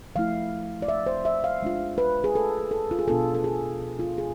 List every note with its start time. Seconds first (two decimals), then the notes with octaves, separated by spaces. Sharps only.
0.16 F3 A3 E4 F5
0.82 D5
0.88 E5
1.06 C5
1.25 E5
1.44 F5
1.62 G#3 D4 F4
1.98 B4
2.24 G#4
2.35 A4
2.71 A4
2.91 F4
2.99 G#4
3.08 B2 B3 D4 F4 A4
3.35 A4
3.44 G#4
3.99 F4
4.18 G#4